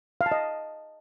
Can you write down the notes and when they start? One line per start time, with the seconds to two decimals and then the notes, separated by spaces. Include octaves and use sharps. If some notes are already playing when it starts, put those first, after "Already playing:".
0.21 F5
0.26 A5
0.32 D#5